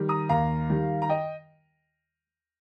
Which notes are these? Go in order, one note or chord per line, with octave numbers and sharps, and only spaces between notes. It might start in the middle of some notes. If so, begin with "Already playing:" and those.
Already playing: D#3 G3
A#5 D#6
D#2 F5 A#5
D#3 G3
A#5
D#5 G5